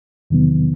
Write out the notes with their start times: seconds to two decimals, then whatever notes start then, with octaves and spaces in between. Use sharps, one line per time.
0.30 E2 C3 D#3 F#3 B3